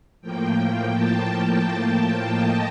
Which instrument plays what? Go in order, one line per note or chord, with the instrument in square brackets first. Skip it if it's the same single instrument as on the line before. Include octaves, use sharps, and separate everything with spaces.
[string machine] A2 F3 A#3 G5
A5
G5
D#5